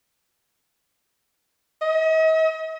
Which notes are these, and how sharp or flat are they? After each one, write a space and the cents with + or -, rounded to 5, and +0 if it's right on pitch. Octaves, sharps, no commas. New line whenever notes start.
D#5 +45